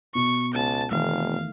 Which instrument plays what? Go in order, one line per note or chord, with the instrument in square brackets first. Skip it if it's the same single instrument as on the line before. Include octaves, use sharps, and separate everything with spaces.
[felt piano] B2 [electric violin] C#6
[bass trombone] C#2 [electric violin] A5
[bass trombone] F1 [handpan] D#3 E3 A3 [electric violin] F5